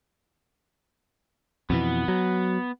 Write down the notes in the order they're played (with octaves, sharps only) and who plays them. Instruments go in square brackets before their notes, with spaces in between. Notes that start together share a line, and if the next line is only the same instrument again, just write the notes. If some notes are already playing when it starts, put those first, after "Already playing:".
[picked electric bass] F2 B2 E3 [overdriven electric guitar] B3
[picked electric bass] F#3